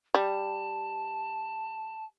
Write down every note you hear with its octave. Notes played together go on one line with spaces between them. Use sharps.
G3 A5